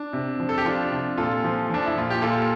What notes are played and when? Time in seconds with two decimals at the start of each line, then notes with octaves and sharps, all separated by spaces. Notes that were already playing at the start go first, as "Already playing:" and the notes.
Already playing: D4
0.13 C3
0.40 F3
0.49 A4
0.58 G4
0.65 F3 D4 F4
0.92 C3
1.18 A#2 F4 A4
1.44 F3
1.70 F3 D4
1.86 E4
1.96 A#2 F4
2.10 G4
2.22 A#2 F4 A4